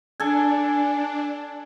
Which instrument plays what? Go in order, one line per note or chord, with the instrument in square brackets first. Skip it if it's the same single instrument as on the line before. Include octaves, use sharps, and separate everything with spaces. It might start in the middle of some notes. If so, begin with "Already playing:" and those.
[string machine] D4 [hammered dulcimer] A4 G#5